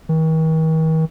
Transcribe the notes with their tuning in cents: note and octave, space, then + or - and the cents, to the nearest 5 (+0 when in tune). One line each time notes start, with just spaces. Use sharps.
D#3 +45